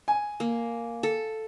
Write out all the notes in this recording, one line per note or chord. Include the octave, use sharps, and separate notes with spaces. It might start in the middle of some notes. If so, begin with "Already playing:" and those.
G#5
A#3
A4